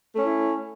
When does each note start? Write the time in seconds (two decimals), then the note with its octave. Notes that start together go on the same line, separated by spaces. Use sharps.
0.13 A3
0.18 C#4
0.23 E4